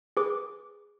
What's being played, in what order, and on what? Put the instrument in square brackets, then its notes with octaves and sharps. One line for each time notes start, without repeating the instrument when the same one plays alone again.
[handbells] G#4 B4 D6